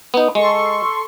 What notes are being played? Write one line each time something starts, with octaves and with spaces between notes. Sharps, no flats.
B3 D#4
G#3 A4 C6 C#6